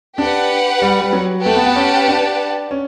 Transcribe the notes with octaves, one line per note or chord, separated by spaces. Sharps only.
D4 G4 B4 F#5
G3
G3
F#3
A3 G4 B4 F#5 A5
B3
B3
C#4
D4
C#4